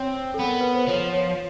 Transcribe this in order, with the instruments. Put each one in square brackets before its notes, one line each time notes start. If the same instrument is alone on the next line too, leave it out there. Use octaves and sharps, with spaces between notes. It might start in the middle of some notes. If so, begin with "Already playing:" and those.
Already playing: [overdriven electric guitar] C4 [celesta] C#5
[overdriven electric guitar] B3 [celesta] A4
[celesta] A#4
B4
C5
[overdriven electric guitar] F3 [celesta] C#5
[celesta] C#5